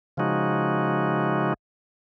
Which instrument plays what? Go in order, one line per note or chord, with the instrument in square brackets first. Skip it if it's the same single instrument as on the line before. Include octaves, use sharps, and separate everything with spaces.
[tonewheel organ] C#3 F3 G#3 D#4 F#4